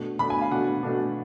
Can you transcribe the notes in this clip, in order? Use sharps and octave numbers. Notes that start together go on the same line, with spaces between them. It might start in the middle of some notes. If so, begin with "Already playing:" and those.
Already playing: B2 A3 D4
B2 A3 D4 B5
G#5
F5
B2 A3 D4 F#5
B2 A3 D4